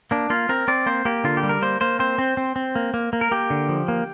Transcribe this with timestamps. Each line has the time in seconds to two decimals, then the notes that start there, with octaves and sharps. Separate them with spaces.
0.11 A#3 D4
0.30 A#3 F4
0.49 C4 A#4
0.68 C4 D5
0.86 A#3 C5
1.05 A#3 G4
1.24 D3 F4
1.37 G4
1.43 G3
1.49 A#4
1.62 A#3 C5
1.81 A#3 C5
1.99 C4 C5
2.18 C4
2.37 C4
2.56 C4
2.76 A#3
2.94 A#3
3.13 A#3
3.21 A#4
3.31 A#3 G4
3.50 D3
3.69 F3
3.88 A#3